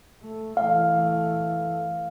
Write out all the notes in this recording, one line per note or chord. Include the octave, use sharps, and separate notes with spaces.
A3
E3 A3 F5